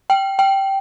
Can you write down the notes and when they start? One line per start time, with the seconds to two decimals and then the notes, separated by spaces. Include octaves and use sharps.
0.10 G5
0.39 G5